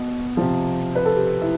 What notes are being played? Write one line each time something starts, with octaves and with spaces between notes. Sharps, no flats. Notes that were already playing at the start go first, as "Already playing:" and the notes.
Already playing: B2
C3 F3
B4
A4
G4
E4